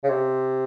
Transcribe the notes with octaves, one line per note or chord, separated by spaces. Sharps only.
C#3
C3